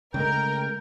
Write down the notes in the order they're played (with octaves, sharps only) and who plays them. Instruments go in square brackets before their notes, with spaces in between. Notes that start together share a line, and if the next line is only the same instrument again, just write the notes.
[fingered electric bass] C#3 G#3 A3 [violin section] A#4 [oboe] G5